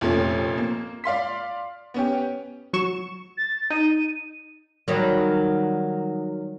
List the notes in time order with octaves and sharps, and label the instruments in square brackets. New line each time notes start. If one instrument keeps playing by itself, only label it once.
[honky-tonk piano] F1 F2 A#2 A3 C#4
A#3
D5 F5 C6 B6
B3 C#4 G4
[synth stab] F#3 C#6 E7
[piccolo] A6
[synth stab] D#4 [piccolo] D#7
[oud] D#3 F#3 G3